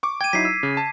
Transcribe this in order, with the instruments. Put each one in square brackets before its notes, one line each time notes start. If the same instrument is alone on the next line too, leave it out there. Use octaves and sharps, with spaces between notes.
[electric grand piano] C#6 D6
[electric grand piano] G5 [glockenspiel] G#6 D#7
[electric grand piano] F#3 D#4 E4 [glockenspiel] B6 C7
[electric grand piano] E6
C#3
A5